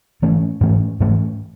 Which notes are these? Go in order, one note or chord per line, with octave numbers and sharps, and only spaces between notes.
G#2 E3 A3 C#4
G#2 E3 A3 C#4
G#2 E3 A3 C#4